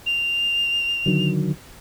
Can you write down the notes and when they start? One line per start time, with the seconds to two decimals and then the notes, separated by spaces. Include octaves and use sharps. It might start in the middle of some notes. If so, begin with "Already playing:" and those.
0.06 F7
1.06 D3 D#3 F#3